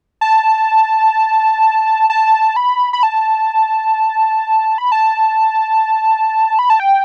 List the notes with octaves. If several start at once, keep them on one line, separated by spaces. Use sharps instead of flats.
A5
A5
B5
B5
A5
B5
A5
B5
A5
G5